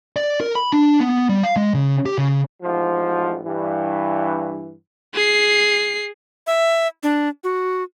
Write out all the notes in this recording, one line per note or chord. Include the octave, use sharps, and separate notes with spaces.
D5
A#4
B5
D4
B3
G3
F5
G#3
C#3
G4
C#3
A1 G#2 F3
G2 E3
G#4 C7
E5
D4
F#4